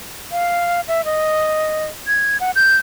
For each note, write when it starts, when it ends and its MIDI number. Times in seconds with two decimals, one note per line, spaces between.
0.32 0.81 77
0.88 1.04 76
1.05 1.85 75
2.07 2.40 92
2.40 2.51 78
2.56 2.76 91